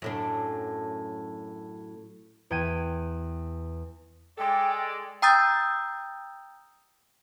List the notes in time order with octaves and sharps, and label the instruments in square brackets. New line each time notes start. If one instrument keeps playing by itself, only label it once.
[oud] F#2 A2 D4
[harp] E2 G5 G#6 D#7
[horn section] G#3 A4 D5 [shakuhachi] G5
[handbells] G5 A#5 D#6 E6 G6 A6